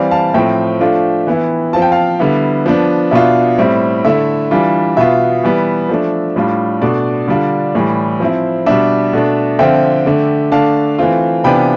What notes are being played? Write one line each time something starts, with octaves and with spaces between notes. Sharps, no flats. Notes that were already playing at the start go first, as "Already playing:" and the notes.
Already playing: E3 G3 C4 D5 F5
F5 A5
A2 F3 A3 C4 E5 G5
F3 A3 D4 F4
E3 B3 E4
F3 C4 F4 A5
G5
F5 A5
D3 G3 B3 E4
F3 B3 D4
B2 B3 D4 F4 E5
A2 G3 C4 E4
D3 A3 E4 E5
E3 G3 D4 F4
B2 B3 F4 E5
E3 G3 B3
F3 A3 D4
A2 G3 D4 F4
B2 A3 D4 D5
D3 G3 D4 F4
A2 E3 G3
F3 C4 E4
B2 G3 D4 E5
B2 A3 D4
D3 F3 C4 F4 E5 G5
D3 A3 D4
D3 A3 D4 F5 A5
E3 A3 C4 F4
C3 E3 B3 D4 F4 G5 B5